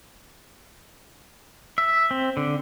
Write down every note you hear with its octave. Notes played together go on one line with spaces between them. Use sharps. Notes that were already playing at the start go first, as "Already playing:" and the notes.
E5
C4
D3